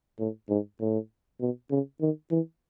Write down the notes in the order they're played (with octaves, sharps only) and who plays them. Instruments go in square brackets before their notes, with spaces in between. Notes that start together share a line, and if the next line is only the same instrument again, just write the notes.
[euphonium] A2
G#2
A2
B2
C#3
D#3
E3